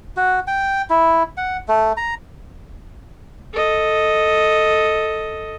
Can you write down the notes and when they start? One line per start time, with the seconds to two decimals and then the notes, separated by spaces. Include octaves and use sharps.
0.17 F#4
0.47 G5
0.90 E4
1.37 F#5
1.68 A3
1.97 A#5
3.53 A4 D#5